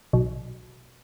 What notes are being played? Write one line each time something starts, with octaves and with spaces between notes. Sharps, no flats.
B1